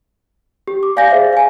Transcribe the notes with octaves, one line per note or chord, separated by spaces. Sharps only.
G4
D6
D5 F5 G#5 G6 A#6
G#4 C5 E5 F5
F5 G#5